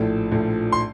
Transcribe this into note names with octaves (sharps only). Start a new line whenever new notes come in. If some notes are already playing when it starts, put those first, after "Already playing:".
Already playing: A#1 A2 F3 A3
A#1 A2 F3 A3
C6